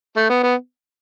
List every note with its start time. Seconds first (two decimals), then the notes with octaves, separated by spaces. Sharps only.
0.16 A3
0.29 B3
0.43 B3